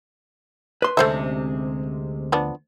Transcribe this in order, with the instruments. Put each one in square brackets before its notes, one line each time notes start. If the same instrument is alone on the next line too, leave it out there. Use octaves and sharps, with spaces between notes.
[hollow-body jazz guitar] B4 C6
[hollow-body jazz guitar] D2 [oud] C3 G#3 C#4 [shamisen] A3 C5 E5
[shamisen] F3 B3 D4